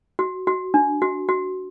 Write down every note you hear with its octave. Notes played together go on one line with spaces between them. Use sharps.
F#4
F#4
D4
F#4
F#4